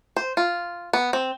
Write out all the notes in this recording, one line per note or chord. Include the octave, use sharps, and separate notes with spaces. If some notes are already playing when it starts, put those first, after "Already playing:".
C5
F4
B3
C4